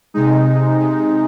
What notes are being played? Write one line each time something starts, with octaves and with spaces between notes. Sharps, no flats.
C3 G#3 D#4
C3 G#3